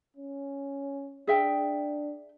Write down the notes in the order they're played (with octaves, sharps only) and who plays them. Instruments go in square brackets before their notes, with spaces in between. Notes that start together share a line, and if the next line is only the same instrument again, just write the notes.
[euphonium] C#4
[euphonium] D4 [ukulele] G#4 E5 G5